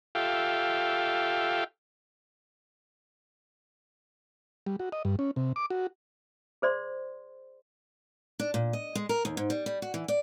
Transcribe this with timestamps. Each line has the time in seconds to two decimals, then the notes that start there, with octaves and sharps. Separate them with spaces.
0.15 F4 G4 A4 E5 F5 G5
4.67 G3
4.80 F#4
4.92 D#5
5.05 G2
5.19 C#4
5.36 C3
5.56 D6
5.70 F#4
6.62 G#4 C5 D5 C6
8.40 D4
8.54 A#2
8.73 D#5
8.95 G#3
9.09 A#4
9.25 D#2
9.37 G#2
9.50 G3
9.66 G3
9.82 F#4
9.94 E3
10.08 D5